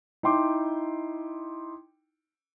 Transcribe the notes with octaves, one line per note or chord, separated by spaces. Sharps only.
D#4 E4 G5 C6 D6